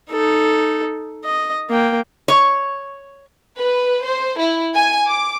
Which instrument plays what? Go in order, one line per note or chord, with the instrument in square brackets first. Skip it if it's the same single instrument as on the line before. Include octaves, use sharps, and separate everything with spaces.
[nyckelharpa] D#4 A4
D#5
A#3 G5
[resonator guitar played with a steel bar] C#5
[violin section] B4
C5
E4
G#5
D6